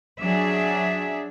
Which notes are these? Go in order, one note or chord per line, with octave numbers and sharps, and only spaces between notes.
F#3 D4 G#4 E5